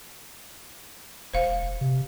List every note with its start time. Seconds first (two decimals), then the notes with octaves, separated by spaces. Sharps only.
1.33 E1 C5 F5
1.81 C3